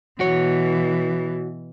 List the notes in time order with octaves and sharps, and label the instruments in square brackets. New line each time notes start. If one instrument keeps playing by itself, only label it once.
[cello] B2 E3 [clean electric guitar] F#4 C#5